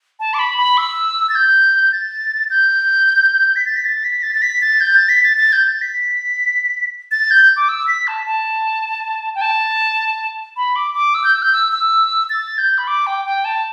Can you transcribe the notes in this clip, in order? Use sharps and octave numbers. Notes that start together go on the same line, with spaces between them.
A5
D6
B5
B5
E6
A6
G6
A6
G6
B6
A6
B6
A6
B6
A6
A6
B6
A6
G6
A6
B6
A6
A6
G6
A6
B6
A6
G6
D6
E6
B6
A5
A5
G5
A5
B5
D6
D6
E6
G6
E6
G6
E6
E6
A6
G6
B5
D6
G5
G5
A5